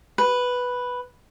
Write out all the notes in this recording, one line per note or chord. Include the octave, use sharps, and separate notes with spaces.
B4